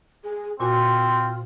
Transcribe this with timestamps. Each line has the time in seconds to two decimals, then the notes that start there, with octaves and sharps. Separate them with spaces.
0.24 G#4
0.60 A#2 C4 F4 F#4 G#5